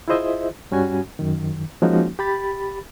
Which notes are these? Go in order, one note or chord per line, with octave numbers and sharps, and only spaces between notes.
E4 F4 G#4 C5 D#5 E5
G2 G3 C#4 F#4 G#5
F#2 D#3
F3 G#3 A#3 C#4 D#4 F#4
G4 B5 A6